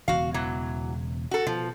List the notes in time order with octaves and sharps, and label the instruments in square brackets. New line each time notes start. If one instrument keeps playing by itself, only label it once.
[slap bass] E1 E2 C#3 [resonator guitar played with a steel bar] F#4 F5
[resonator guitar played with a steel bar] E3 F#3
F#4 A4
[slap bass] B2 [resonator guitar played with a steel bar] F3